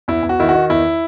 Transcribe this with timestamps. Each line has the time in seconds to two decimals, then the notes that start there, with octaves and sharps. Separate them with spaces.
0.08 E2 E4
0.23 E2
0.29 F#4
0.40 D#3 E4
0.49 F#4
0.55 D#3
0.70 E2 E4